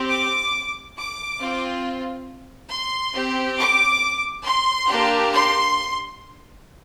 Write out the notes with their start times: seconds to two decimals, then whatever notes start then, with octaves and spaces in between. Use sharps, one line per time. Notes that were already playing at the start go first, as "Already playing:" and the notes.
Already playing: C4 G4
0.10 D6
0.97 D6
1.40 C4 F4
2.71 C6
3.15 C4 G4
3.59 D6
4.46 C6
4.88 A#3 D4 G4
5.33 C6